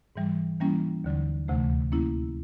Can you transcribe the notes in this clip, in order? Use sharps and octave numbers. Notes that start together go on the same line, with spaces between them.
G#2 E3 G3
E3 G3 A#3 C#4 E4
D#2 D3 F#3
D2 C3 E3 A3
F#3 A#3 C#4 E4